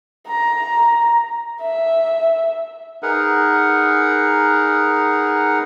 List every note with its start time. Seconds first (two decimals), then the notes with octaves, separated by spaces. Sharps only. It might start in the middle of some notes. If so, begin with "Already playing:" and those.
0.27 A#5
1.62 E5
3.03 D#4 G#4 A#4 B4 F#5